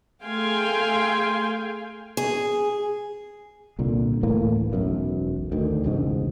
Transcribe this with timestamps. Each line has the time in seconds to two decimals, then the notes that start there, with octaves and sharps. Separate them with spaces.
0.23 A3 G#4 F5 G5 G#5 C6
2.17 G#4
3.79 C2 A#2 D3
4.23 D2 A2 E3 A#3
4.73 E1 B1 F#2
5.52 D2 D#3
5.84 E1 C#2 G#2